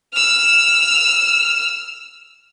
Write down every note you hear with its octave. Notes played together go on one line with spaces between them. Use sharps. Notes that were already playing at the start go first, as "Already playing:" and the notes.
E6 F6